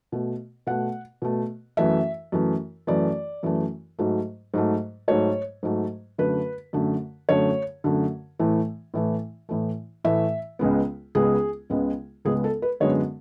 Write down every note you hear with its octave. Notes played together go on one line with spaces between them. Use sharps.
B2 A3
B2 A3 F#5
B2 A3
F#2 E3 A3 E5
F#2 E3 A3
F#2 E3 A3 D5
F#2 E3 A3
G#2 F#3 A3
G#2 F#3 A3
G#2 F#3 A3 C#5
G#2 F#3 A3
F#2 D3 A3 B4
F#2 D3 A3
F#2 D3 A3 C#5
F#2 D3 A3
A2 E3 A3
A2 E3 A3
A2 E3 A3
A2 E3 A3 E5
C#2 C#3 G#3 B3
C#2 C#3 G#3 B3 G#4
C#2 C#3 G#3 B3
C#2 C#3 G#3 B3 G#4
A4
B4
F#2 D3 G#3 B3 C#5